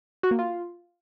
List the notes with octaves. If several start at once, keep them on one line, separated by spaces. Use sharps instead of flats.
F#4
A#3
F4